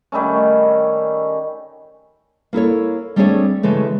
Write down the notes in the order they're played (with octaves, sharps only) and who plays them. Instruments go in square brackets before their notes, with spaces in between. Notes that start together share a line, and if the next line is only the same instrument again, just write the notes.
[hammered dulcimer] D#3 G3 A3 C#4
[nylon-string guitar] A#3 E4 A4 C#5
G3 A3 C4 D4 G#4 C#5
C#3 E3 G#3 A3